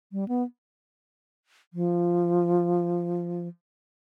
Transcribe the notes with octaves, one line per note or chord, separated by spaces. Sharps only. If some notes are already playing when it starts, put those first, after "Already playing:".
G3
B3
F3